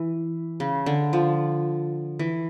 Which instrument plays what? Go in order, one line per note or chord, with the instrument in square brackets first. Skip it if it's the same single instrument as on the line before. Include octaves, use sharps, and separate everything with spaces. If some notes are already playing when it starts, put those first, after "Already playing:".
Already playing: [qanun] E3
C#3
D3
F3
E3